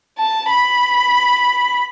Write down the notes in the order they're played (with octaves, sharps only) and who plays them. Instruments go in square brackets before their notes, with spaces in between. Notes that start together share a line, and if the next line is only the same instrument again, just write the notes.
[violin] A5
B5